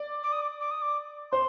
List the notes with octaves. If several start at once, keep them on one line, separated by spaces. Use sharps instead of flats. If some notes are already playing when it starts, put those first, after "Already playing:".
Already playing: D5
D6
D#6
D6
D6
D#6
D6
C5 C6